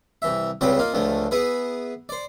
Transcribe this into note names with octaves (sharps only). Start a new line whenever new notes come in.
C2 E3 E5
C#2 C#3 G3 C4 B4 G5
A#3 D#4 F4
C#2 D3 F3 A3
B3 E4 G#4 B4
C5 D5